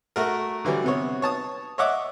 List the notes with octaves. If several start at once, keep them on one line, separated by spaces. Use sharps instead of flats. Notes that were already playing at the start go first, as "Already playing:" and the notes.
A3 F#4 A#4
D3 E3 F#3 G3
C3 B3 C#5
C#5 A5 D#6
C#5 D#5 E5 F#5 D6